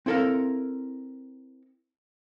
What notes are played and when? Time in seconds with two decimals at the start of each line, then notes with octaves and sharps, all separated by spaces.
0.06 C4 E4 A4 A#4 F5